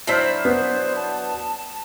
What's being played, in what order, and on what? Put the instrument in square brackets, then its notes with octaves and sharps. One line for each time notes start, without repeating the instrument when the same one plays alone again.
[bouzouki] F#3 D4 E4 [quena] C5 [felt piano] F6 B6 C7
[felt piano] B3 [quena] C5
[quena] A5